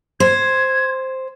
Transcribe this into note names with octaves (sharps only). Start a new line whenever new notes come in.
C5 G#6